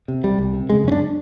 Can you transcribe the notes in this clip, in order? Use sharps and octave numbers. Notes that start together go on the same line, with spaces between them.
C3
C2 G3
C2
C3
C#3 G#3
F#2 C#4
D4